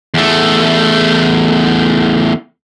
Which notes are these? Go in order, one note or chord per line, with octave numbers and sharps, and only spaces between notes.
E2 A3